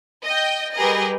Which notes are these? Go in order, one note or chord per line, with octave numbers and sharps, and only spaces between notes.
D#5 G5
G3 G4 G#4 A#4 B4 D#5